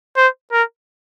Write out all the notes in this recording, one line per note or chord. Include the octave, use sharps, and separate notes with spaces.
C5
A#4